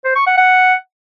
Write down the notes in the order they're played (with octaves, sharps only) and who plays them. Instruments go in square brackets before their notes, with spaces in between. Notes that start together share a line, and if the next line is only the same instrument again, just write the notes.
[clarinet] C5
C#6
F#5
F#5